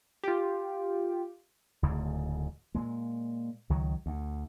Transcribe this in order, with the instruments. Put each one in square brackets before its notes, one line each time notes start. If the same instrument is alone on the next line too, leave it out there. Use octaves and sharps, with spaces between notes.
[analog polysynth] F4 G4
[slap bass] D1 D2 G#2 C#3
A#2 G#3
C#2 D#3 F#3
D2